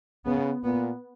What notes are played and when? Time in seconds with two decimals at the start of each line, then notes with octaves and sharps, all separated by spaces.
0.26 C#3 B3
0.64 A#2 B3